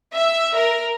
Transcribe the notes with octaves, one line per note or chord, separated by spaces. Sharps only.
E5
A#4